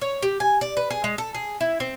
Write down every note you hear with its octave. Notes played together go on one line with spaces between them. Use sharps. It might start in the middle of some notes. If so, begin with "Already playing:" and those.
C#5
G4
G#5
D5
B4
G#4
G#3
A4
G#4
E4
C4